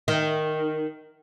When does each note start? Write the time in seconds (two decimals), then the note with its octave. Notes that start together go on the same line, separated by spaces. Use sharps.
0.08 D#3